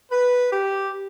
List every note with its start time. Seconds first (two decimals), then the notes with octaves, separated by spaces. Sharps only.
0.11 B4
0.51 G4